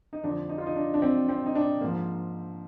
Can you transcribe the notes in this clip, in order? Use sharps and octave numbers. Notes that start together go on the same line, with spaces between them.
D#4
F2 D3 F3 D4
D#4
F4
D#4
D4
D4
C4
C4
D#4
D4
G#2 F3 A#3